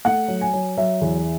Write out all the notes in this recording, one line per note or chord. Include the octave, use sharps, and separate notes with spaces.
A3 F#5
F#3
G#5
F#3
F#3 E5
E2